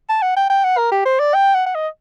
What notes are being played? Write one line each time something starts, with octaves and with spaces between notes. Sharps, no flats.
A5
F#5
G5
G5
F#5
A#4
G4
C5
D5
G5
F#5
F#5
D#5